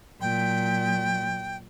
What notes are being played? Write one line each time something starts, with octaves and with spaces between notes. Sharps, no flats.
A#2 F#3 G5